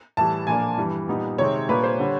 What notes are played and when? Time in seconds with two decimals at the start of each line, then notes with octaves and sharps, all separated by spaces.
0.17 A2 E3 G3 A5
0.47 A#2 F3 A#3 D4 G#5
0.77 G2 E3 G3
1.08 A#2 G3 B3 D#4
1.38 C3 D#3 G#3 C4 C#5
1.68 A#2 G3 A#3 D4 B4
1.84 C5
1.98 D3 G3